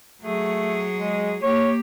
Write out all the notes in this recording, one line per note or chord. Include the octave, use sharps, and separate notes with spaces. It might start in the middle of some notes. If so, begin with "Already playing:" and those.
F#3 A3 G#4
G#3
A#3 G4 C#5